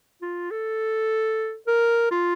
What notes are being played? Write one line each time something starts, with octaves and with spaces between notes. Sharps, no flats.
F4
A4
A#4
F4